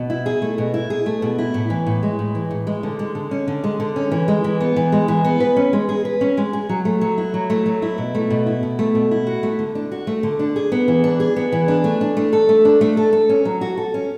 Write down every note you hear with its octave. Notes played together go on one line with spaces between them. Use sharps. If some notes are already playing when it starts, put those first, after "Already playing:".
Already playing: B2
E4
G#4
A3
B2
E4
G#4
A3
B2
E4
A2
E3
A2
G#3
A2
E3
A2
G#3
D3
G#3
D3
C#4
D3
G#3
D3
C#4
E3
G#3
E3
B3
E3
G#3
E3
B3
B4
C#4
G#3
G#4
B4
C#4
G#3
G#4
F#3
A3
F#3
E4
F#3
A3
F#3
E4
B2
A3
B2
E4
B2
A3
B2
E4
F#4
A3
D3
D4
F#4
A3
D3
D4
G#4
B3
E3
D4
G#4
B3
E3
D4
A3
D4
A3
A4
A3
D4
A3
A4
A4
C#4
F#3
F#4
A4
C#4